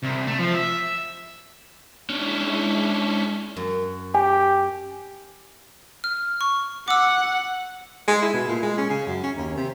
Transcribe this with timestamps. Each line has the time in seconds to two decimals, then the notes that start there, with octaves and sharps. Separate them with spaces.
0.03 C2
0.27 A3
0.39 F3
0.55 E5
2.10 G#3 C#4 D4 E4 E5
3.56 F#2
4.15 G4 G#5
6.04 F6
6.41 C#6
6.88 F#5 D6 E6
8.08 G#3
8.22 E4
8.34 B2
8.49 A#2
8.62 G#3
8.78 C#4
8.90 C#3
9.07 F#2
9.23 C#4
9.37 D#2
9.57 C3